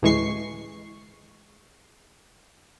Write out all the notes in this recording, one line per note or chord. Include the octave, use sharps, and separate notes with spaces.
A1 D2 E3 G#3 C#6 C7